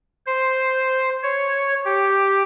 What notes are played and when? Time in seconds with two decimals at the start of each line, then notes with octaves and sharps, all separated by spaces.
0.26 C5
1.23 C#5
1.85 G4